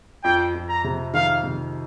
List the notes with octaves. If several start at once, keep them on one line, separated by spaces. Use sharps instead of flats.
F2 G5
F2
A#5
C3
D#3 F5
C3